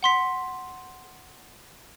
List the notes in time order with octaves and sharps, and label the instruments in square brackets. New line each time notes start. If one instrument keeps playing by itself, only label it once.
[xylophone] F#5 C6 B6